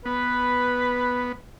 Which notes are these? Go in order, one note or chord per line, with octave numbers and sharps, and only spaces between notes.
B3 B4